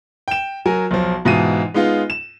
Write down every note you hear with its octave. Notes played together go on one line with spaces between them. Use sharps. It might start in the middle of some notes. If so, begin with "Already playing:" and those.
G5 E7
F#3 A#4 G#5
B1 F3
G#2 B2 E3 F4 D#7
G#3 B3 D#4 F4
E7